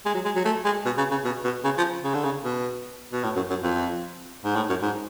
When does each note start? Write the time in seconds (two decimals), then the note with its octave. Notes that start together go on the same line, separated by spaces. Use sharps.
0.06 G#3
0.15 F#3
0.25 G#3
0.36 F#3
0.45 A3
0.65 G#3
0.85 B2
0.98 C#3
1.11 C#3
1.25 B2
1.44 B2
1.64 C#3
1.78 F3
2.04 C#3
2.14 D3
2.24 C#3
2.44 B2
3.13 B2
3.24 A2
3.36 F#2
3.50 F#2
3.63 F2
4.44 G#2
4.56 A2
4.69 F#2
4.82 G#2